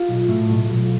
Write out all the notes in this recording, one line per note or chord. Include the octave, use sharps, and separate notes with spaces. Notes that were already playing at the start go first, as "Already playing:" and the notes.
Already playing: F4
B1
A2
B1
B1